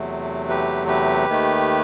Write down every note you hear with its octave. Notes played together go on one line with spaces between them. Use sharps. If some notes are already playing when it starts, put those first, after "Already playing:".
Already playing: E2 C3 F#3 A3
G4 B4
G4 B4
D#2 D#3 A3